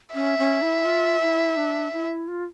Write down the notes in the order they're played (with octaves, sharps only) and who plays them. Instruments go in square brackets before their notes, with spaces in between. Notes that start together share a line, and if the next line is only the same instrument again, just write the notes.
[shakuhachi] C#4 [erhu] E5
[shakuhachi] C#4
E4
F4
E4
D4
E4
F4